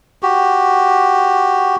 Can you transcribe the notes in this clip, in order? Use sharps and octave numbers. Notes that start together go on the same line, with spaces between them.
F#4 G4